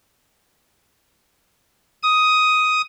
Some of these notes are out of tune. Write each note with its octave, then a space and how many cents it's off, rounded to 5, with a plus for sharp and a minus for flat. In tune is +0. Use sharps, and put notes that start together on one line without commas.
D#6 +10